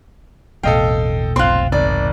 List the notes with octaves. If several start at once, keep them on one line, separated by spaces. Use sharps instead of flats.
E1 A1 B2 A4 D#5 F5 G5
F1 B1 C4 F4 C6 F#6
G#1 D5